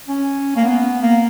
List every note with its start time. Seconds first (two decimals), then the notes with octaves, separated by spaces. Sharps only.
0.08 C#4
0.56 A#3
0.64 B3
1.02 A#3